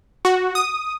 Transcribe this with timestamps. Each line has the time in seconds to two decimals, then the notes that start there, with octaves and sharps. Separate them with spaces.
0.25 F#4
0.55 D#6